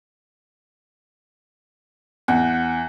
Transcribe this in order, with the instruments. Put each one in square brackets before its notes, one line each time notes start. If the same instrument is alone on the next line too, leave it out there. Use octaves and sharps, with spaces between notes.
[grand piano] E2 [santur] F#5